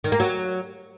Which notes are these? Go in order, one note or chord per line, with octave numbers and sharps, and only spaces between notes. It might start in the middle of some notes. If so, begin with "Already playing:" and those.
D#3
A#3
F#3